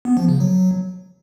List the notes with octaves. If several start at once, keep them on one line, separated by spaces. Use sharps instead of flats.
B3
F3
C#3
F#3